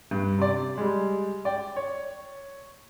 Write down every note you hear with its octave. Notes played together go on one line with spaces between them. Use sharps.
G2
C3 D5
G3 G#3
D5 G5
C#5